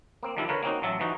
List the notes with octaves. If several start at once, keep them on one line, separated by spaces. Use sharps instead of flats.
A#3 C4
D#3 F3 G3 D4 E4 F4
D3 A#4 B4 C#5
A#3 C4 C#4 D#4 F#4
A1 F#3 E5 A5
E3 F3 D#4 F#4